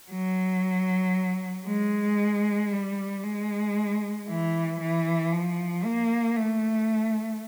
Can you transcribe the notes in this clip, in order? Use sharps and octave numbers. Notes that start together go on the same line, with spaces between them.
F#3
G#3
G3
G#3
E3
E3
F3
A#3
A3